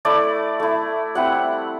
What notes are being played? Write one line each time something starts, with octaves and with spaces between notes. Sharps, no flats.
A3 E4 D5
A3 E4
G3 C4 E4 F#5